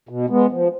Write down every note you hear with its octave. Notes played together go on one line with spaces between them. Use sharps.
B2
G#3 B3
F3